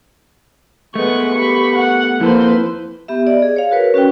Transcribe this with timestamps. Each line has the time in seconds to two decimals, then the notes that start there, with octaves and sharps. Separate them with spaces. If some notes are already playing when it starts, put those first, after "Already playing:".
0.95 G#3 A3 B3 B4 F#5 C#6
1.35 G4 B5 C#6
1.76 F#5
2.21 F2 A#3 E4 A4 B4 C5
3.08 B3 G4 E5
3.27 D5 D#5
3.42 G#4
3.56 C#5 F5
3.71 F#4 A#4 B4 C#5
3.94 C#4 F#4 B4 G5